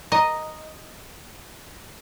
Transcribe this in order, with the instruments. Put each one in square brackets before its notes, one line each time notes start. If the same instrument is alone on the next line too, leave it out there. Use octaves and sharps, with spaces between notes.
[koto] D#5 [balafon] A#5